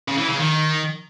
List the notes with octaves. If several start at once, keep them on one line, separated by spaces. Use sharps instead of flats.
C#3
E3
C#3
D#3